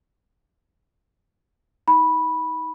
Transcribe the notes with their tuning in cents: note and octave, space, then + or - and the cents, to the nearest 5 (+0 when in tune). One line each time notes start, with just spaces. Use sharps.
D#4 +30 B5 -10